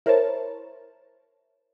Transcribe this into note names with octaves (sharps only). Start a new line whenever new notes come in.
E4 A#4 C5 C#5 A5